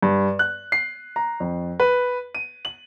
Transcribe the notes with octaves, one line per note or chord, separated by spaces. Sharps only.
G2
F#6
C7
A#5
F2
B4
D#7
F#7